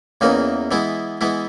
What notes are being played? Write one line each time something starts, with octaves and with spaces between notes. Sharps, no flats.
E2 C#3 E3 A#3 D#4
E3 G#3 B3 E4
E3 G#3 B3 E4